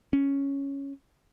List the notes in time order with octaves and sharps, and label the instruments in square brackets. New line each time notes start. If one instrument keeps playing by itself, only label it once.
[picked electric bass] C#4